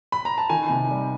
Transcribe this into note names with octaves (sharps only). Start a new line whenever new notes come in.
B5
A#5
A5
D#3 G#5
C3
G3